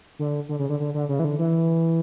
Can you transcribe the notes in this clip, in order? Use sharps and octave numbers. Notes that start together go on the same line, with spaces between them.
D3
D3
C#3
D3
D3
D3
C#3
E3
D3
E3